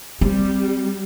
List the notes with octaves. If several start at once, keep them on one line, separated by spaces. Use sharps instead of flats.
G3 C4